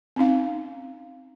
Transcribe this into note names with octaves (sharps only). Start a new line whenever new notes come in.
C4 C#4 D#4 F5